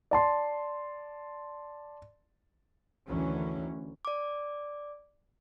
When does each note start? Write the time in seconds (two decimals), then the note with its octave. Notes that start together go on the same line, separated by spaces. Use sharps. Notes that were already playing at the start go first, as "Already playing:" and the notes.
0.11 D5 A5 C6
3.07 D2 D#3 E3 F#3 C#4
4.05 D5 D6